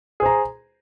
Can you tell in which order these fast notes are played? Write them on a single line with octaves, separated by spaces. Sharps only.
G#4 C5 A#5